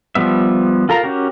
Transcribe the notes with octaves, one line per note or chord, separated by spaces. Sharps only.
F3 G3 B3 E5
F4 A4 A#4 F5 A#5
C#4 F#4 G4 A#4